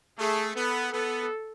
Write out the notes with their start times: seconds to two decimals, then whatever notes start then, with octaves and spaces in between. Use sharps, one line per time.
0.18 A3 G#4
0.56 B3 A4
0.93 B3 A4